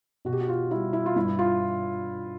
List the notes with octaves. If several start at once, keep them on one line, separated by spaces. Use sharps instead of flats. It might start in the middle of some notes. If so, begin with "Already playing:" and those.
B2 F#4
G4
F#4
F4
G3 E4
E4
F4
G2 E4
F4